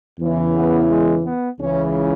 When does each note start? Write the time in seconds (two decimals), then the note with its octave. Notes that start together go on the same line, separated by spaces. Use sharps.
0.20 E2 C#3 E3
0.55 B3
0.90 G#3
1.25 B3
1.60 C#2 C#3 E3 C#4